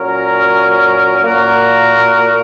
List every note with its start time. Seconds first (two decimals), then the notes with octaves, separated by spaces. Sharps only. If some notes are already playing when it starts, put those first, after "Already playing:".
Already playing: A#2 F#3 C#4 A#4
1.22 A#2 A#3 F#4 A#4